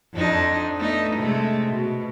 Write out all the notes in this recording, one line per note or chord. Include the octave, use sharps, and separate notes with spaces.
F2 D4 D#4
A3 B3 D#4
C3 G#3 A3
B2